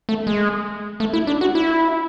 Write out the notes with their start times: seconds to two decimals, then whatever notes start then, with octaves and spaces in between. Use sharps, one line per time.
0.09 A3
0.27 G#3
1.00 A3
1.13 E4
1.27 D4
1.41 F#4
1.55 E4